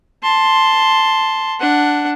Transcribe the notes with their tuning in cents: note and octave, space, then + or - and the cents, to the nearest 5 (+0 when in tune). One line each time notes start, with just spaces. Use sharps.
A5 +0 C6 +0
D4 +0 F#5 +0